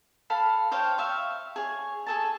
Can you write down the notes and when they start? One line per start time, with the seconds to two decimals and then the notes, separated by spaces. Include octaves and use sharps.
0.30 A4 F5 B5
0.72 C5 C#5 F5 G5
0.98 E5 F5 C#6
1.56 G#4 C#5
2.06 G#4 A4 A5